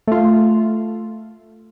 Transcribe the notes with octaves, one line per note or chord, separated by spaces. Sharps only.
A3 F4